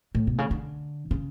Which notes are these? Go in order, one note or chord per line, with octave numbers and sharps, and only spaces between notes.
A2
B2
C#3
D3
C#3